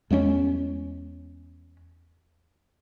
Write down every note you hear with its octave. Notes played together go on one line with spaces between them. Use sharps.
E2 G#3 B3 C#4